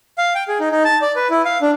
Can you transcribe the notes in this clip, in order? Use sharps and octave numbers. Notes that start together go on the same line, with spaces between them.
F5
G5
G#4
D#4
D#4
A5
D5
B4
E4
F5
D4